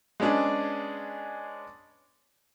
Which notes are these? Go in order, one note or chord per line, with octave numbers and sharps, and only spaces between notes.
G#3 B3 C#4 D4 G#4